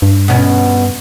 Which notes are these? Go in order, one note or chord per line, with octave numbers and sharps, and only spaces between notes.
G2
B2 C#4